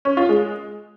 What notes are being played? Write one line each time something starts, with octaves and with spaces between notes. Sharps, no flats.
C#4
F4
G#3